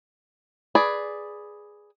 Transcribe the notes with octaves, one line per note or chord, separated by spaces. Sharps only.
G#4 B4 D5